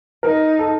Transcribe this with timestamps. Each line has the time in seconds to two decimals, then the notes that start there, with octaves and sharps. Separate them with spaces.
0.23 D#4 A#4
0.59 A4